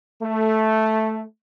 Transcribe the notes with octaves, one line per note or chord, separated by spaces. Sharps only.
A3